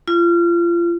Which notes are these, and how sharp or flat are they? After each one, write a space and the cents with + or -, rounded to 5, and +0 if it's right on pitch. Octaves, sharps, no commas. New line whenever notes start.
F4 -30